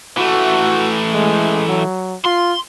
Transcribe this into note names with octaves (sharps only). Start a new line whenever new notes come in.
E3 A3 F#4
G#3
F#3
F4 C6